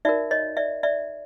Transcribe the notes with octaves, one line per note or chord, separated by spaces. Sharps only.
D#4 F#4 A#4 D5 E5
C#5 D#5
D5 E5
D5 E5